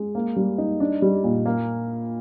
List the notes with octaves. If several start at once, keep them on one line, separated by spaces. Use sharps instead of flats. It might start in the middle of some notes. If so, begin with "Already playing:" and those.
Already playing: G#3
A#3
G3
D#4
D4
G3
A#2
A#3